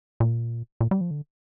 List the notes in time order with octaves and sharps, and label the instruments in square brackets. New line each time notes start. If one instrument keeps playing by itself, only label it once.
[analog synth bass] A#2
A#2
G3
F3
D3